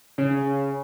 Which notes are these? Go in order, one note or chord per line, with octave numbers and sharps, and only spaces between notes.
C#3